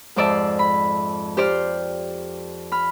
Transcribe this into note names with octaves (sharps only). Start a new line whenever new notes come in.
F2 G#2 C5 D5 E5 A5
B5
G4 C5 D5 F6
B5 F6